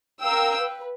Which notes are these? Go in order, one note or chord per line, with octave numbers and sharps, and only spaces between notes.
A#4 F5 G5 E6
B4